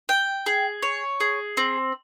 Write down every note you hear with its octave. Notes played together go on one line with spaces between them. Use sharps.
G5
G#4
C#5
G#4
C4